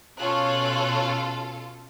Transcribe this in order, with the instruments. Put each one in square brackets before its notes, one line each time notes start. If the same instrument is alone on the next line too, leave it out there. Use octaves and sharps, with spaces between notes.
[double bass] B2 [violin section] C#4 F4 A4 [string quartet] C#5 F#6